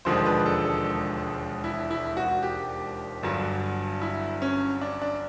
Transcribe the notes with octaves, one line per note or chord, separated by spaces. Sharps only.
E1 D#2 D3 F3 G#3 C5
B4
A4
A4
E4
E4
F#4
G4
G1 G2 D3 F#3
E4
C#4
D4
D4